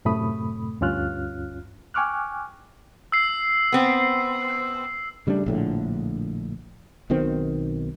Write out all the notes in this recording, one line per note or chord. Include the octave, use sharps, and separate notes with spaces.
F#2 A2 C3 A3 B5 D#6
D2 G2 C#4 F4 F6 F#6
G5 G#5 C#6 D6 F6 F#6
E6 C7
B3 C4
C#3 G3 A3 D4
A#1 A2 D3
B1 B2 D#3 C4